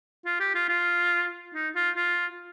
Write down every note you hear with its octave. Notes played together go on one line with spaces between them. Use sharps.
F4
G4
F4
F4
D#4
F4
F4